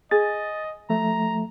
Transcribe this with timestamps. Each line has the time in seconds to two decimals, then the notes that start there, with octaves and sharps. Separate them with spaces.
0.11 G#4 D#5 A6
0.90 F3 A3 A#5